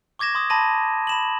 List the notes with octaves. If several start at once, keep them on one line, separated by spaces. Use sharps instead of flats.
C#6 D6 G#6 A#6 E7
C6 D#6
A5 B5 C6 A#6 D#7
B5 E7 F#7